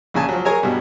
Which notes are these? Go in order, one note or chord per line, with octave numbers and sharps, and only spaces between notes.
A#1 C#3 G#5 A5
F3 F#3
G#4 A#4 C#5 G#5 A#5
G2 B2